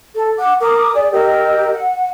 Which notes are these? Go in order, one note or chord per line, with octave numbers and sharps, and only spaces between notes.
A4
F#5 D6
A#4 D6 D#6
G#4 D5
G4 A#4 D#5 E6
F#5